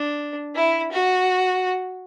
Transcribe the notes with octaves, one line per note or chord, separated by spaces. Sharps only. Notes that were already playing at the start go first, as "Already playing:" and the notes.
Already playing: D4
E4
F#4